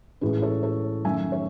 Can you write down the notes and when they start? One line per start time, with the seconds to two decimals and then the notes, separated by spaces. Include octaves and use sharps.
0.21 A2 E3 G#3 C#4 G#4 B4
0.42 A4 C#5
0.63 A4 C#5
1.04 F#2 D#3 A3 C#4 E5 G#5
1.32 C#5 E5